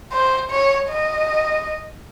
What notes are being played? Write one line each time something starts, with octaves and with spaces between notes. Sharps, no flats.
C5
C#5
D#5